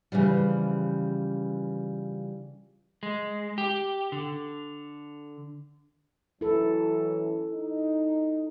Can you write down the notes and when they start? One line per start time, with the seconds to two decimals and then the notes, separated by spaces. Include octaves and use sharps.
0.12 C#3 E3 F3 G3
3.03 G#3
3.58 G4
4.12 D3
6.41 E3 F#3 C#4 E4 A4
7.52 D#4